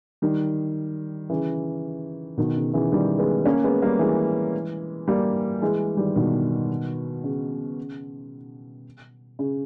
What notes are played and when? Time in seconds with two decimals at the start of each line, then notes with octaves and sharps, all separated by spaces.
0.22 D#3 G3
1.30 C#3 E3
2.37 B2 D#3
2.56 C#3
2.73 C#3 E3
2.92 D#3 G3
3.19 G#3 B3
3.45 A#3 C#4
3.63 G#3 B3
3.82 G3 A#3
3.99 E3 G#3
5.08 G3 A#3
5.62 E3 G#3
5.97 D#3 G3
6.16 B2 D#3
7.24 C#3
9.39 C#3